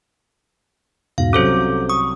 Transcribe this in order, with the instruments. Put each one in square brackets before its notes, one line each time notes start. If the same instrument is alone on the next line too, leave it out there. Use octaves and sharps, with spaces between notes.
[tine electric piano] E2 G#2 B2 [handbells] F5
[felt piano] C2 F#3 [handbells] C#4 A4 C5 [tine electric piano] D6 G6
[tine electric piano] C#6 [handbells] D#6